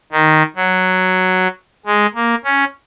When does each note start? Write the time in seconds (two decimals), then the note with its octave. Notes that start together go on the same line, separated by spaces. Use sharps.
0.12 D#3
0.56 F#3
1.86 G#3
2.15 A#3
2.44 C#4